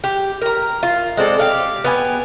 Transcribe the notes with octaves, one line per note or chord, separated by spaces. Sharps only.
G4
A#4 A#5
F4
G#3 C4 A4 D5
G4 F5
B3 G5 G#5